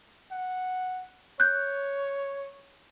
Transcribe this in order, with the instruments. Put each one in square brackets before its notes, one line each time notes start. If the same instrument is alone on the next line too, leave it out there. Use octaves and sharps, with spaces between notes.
[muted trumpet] F#5
[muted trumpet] C#5 [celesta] F#6 G6